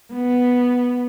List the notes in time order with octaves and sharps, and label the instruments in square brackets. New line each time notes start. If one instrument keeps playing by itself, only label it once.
[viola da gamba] B3